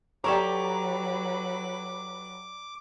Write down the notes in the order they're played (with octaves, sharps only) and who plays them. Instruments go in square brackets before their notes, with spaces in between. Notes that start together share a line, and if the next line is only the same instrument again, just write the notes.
[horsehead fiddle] F#3 B4 [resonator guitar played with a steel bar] G4 A4 C#5 [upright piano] D5 A#5 [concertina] D6